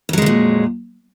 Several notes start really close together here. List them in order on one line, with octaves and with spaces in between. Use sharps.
F2 F#3 G#3 C#3 A#2